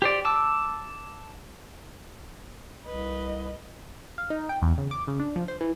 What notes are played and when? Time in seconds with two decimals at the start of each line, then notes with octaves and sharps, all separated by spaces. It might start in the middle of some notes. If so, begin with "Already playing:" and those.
0.02 G4 C5 D5
0.25 A5 D6 E6
2.86 C2 B4 D#5
4.18 F5
4.30 D#4
4.49 G5
4.62 E2
4.78 C#3
4.91 D6
5.07 C#3
5.19 D4
5.36 F3
5.48 C5
5.61 E3